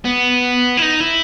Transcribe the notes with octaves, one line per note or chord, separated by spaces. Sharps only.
B3
E4
D#4
E4